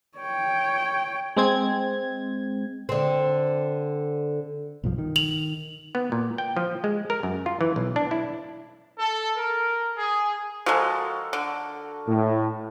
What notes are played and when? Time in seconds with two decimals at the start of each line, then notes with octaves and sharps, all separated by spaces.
0.18 C#5 G5
1.37 G#3 C4 G#6
2.89 D3 C4
4.84 B1 G2 F3
4.98 D#3
5.16 F7 F#7
5.95 B3
6.12 A#2
6.38 G5
6.57 F3
6.84 G#3
7.10 A#4
7.23 F#2
7.46 F4
7.61 E3
7.76 B1
7.96 D4
8.11 E4
8.99 A4
9.38 A#4
9.97 G#4
10.66 F3 G#3 F#4 A4 A#4
11.33 D3
12.07 A2